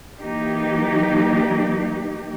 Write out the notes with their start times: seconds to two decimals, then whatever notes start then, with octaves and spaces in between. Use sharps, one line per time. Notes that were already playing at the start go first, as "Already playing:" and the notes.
0.21 E3 F#3 A#3 D#4 G4